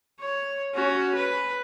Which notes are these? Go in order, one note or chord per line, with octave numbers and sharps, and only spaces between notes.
C#5
C#4 F#4
B4